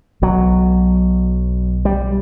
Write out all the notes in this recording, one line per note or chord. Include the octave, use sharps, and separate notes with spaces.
B1 B2 F#3
G3